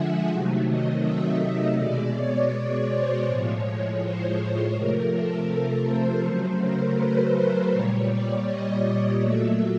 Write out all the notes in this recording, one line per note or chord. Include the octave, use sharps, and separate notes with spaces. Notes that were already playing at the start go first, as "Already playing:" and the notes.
Already playing: D3 F3 G#3 E5 F#5 G#5
C3 D#3 F#3 A3
D#5
E5
D#5
B2 G#3 D5
C#5
C5
A2 F3 G#3 C#5
C#5
C5
C5
C3 F3 A3 A#4
A4
A#4
C5
C#3 F#3 A3 C5
A#4
B4
C5
A#2 G3 C#5
D5
D#5
A#2 F#3 A3 E5